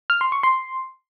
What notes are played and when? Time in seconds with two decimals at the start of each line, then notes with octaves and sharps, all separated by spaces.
0.10 F6
0.21 C6
0.32 C#6
0.43 C6